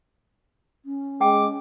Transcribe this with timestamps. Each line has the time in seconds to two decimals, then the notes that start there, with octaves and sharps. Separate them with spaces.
0.85 C#4
1.21 G#3 G5 D6